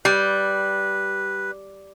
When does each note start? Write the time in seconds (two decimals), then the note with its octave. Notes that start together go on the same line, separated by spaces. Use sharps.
0.05 G3 B4